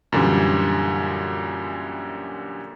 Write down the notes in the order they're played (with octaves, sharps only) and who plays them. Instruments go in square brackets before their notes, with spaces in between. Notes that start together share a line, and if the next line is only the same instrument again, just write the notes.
[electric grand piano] F#2 A#2 D3 E3 G3